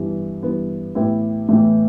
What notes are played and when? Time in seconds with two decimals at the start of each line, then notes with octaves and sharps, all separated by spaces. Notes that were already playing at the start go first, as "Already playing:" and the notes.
Already playing: G2 E3 B3
0.43 G2 E3 B3
0.95 A2 E3 B3 E4 G4
1.49 A2 E3 B3 E4 G4